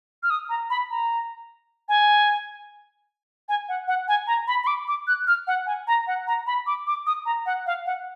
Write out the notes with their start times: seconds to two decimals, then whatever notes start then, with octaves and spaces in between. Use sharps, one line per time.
0.23 F6
0.30 D#6
0.49 A#5
0.70 B5
0.90 A#5
1.89 G#5
3.49 G#5
3.69 F#5
3.88 F#5
4.08 G#5
4.27 A#5
4.48 B5
4.64 B5
4.67 D6
4.88 D6
5.07 F#6
5.27 F6
5.47 F#5
5.66 G#5
5.87 A#5
6.07 F#5
6.27 A#5
6.47 B5
6.67 D6
6.87 D6
7.07 D#6
7.26 A#5
7.46 F#5
7.66 F5
7.86 F#5